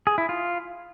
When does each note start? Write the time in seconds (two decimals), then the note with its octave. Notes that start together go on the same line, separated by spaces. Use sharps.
0.07 G#4
0.18 E4
0.29 F4